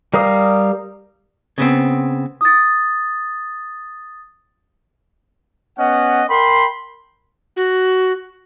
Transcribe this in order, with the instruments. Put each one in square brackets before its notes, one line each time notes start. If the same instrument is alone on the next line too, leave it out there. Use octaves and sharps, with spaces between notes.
[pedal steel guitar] G3 A#4 F5 D#6
[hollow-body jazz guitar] C#3 B3 C4
[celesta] D#6 A6
[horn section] B3 C#4 D#5 F#5
A#4 G5 B5 C6
[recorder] F#4